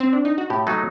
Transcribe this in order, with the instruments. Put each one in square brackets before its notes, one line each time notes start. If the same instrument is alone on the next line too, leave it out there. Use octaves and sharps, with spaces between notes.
[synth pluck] C4
D4
D#4
F#4
[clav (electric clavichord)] A2 [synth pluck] G4
[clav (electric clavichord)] F#3 A3 D#4 [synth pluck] A4